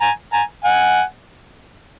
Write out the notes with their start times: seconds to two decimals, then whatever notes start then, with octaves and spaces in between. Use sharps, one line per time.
0.01 G#5 A#5
0.32 G#5 A#5
0.64 F#5 G#5